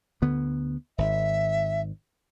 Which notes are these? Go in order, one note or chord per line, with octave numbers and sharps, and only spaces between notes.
D2 D3 B3
G#1 E5